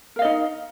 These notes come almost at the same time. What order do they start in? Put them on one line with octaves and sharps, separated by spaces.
A#4 F5 D#5 D#4